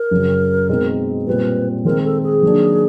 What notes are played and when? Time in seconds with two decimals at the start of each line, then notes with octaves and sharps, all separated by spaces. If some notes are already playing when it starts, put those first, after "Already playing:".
Already playing: A#4
0.11 F#2 C#3 F#3
0.69 B2 G#3 C4 D#4
1.27 A#2 G3 C4 B4
1.85 D#3 G#3 C4 D#4 A#4
2.05 A4
2.23 G#4
2.43 D#3 F#3 A#3 D4